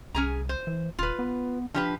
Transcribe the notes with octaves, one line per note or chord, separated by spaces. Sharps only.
C2 C#4 G#4 A#5
C5
E3
D#1 F4 B4
B3
F3 D4 G4 B4